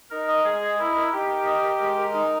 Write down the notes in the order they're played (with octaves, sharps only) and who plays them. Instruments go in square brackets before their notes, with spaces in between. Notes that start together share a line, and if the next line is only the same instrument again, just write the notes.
[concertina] D#4 [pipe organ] A#4
[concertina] D#5
[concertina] G#3 [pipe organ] G#4
[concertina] D#5
[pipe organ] E4 [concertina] A#4
[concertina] A#4
[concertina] D#4 [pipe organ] G4
[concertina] A#4
D#5
A#4
G#3
A#4
D#4